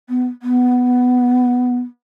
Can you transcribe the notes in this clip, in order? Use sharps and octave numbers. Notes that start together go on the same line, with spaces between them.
B3
B3